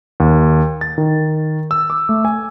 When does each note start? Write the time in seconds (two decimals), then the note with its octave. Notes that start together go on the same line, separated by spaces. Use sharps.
0.20 D#2
0.81 A6
0.98 D#3
1.71 E6
1.90 D6
2.09 A3
2.25 G#5